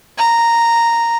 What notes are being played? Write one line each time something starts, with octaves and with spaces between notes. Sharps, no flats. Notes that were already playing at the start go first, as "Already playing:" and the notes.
A#5